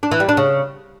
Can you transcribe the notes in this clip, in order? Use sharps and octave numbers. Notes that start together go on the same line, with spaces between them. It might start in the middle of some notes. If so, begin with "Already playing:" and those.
D4
E3
G3
D4
C#3